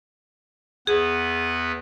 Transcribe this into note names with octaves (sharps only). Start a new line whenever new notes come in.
E2 B3 G#4 B4